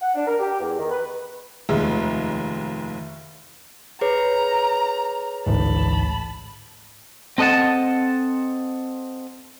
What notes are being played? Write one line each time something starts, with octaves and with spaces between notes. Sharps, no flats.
F#5
D4
A#4
G4
E2
D#3
B4
F1 D#2 G#3 E5
G#4 B4 C#5 A#5
A1 D2 G#2 A5 B5
C4 A4 D#5 F#5 A5